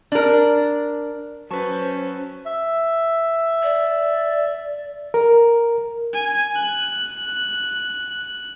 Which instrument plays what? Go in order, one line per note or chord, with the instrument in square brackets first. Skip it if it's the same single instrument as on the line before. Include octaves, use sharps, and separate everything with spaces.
[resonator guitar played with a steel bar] D4 A#4
[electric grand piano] F#3 B4 [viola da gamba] C#4 [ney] C5 [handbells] A5 C#6
[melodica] E5
[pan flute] D5
[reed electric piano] A#4
[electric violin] G#5
F#6